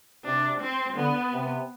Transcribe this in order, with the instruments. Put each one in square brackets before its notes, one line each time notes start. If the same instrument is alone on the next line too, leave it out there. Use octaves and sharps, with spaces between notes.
[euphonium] C3 [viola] D4
[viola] C4
[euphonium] D3 [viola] B3
[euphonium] C3